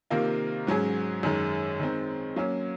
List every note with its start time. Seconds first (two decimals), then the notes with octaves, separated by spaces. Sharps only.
0.10 C3 D#3 A#3 F4 A#4
0.67 G#2 F#3 C#4 G#4
1.23 F#2 D#3 G#3
1.80 D#3 G#3 C4
2.36 F#3 A#3 C#4